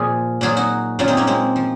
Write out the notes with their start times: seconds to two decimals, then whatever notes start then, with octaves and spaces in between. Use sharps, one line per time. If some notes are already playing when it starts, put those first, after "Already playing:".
Already playing: A#2 F3 C#4 F4 G#4
0.41 A#2 F#3 F4 G#4
0.57 D#4 F#4
0.99 A#2 F#3 C#4 F4
1.08 C4 D#4
1.17 A#3 C#4
1.27 G#3 C4
1.56 F3